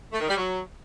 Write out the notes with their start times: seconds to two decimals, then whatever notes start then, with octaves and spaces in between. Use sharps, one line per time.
0.12 A3
0.20 D#3
0.28 G3
0.36 F#3